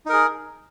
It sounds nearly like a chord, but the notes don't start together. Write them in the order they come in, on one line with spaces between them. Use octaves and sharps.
D#4 A#4 G#4